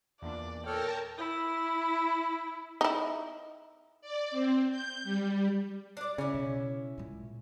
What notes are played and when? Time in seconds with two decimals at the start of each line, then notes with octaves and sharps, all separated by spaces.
0.22 E2 A#2 D4 D5
0.66 A4 A#4 C#5 G5 A5 A#5 F6
1.18 E4
2.81 D#4 E4
4.01 D5
4.31 C4
4.71 G6
5.04 G3
5.97 D4 D5
6.18 C#3 C#4 E4
6.34 B2
6.98 A#2 G#3